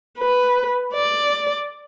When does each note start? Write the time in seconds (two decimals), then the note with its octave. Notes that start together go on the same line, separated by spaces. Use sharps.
0.19 B4
0.94 D5